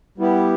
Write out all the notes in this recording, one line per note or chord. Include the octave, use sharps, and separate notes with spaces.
G3 B3 E4 G4